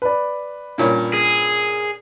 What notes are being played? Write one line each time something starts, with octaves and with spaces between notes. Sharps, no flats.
B4 D5
G2 A#2 C#4
G#4